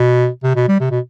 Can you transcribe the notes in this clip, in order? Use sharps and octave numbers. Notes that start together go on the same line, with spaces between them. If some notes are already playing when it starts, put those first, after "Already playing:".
Already playing: B2
C3
B2
G3
C3
B2